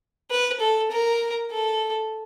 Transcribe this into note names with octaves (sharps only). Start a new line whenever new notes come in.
B4
A4
A#4
A4